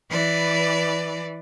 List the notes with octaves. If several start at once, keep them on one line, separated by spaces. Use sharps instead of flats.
E3 B4 D5